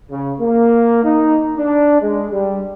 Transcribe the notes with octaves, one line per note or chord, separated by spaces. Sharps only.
C#3
A#3
D#4
D4
G#3
G3